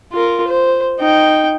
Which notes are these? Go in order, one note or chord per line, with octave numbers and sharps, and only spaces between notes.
F4 A#4
C5
D#4 G5